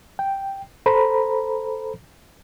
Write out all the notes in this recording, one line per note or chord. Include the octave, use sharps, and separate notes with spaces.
G5
A4 C5 A#5 B5